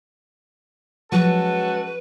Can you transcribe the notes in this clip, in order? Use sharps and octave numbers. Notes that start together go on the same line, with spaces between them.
F3 F#3 G#3 C#4 F#4 A4 B4